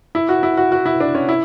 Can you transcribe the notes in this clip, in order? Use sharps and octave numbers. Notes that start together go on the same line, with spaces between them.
E4
F#4
E4
F#4
F#4
E4
D4
C#4
E4